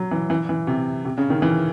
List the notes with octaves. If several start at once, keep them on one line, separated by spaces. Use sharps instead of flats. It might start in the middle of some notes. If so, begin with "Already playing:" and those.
Already playing: F#3
E3
E3
E3
C3
C3
C#3
D#3
E3